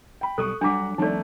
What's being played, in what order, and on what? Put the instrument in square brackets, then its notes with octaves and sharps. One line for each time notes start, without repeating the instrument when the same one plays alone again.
[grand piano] G5 B5
[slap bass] B1 G3 [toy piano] A4 [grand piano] C#6 D#6 F#6
[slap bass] F#3 G3 [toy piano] D4 D6 [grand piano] F#5 A#5 B6
[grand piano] D#3 A3 [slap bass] F3 G3 C4 [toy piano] D#4 D5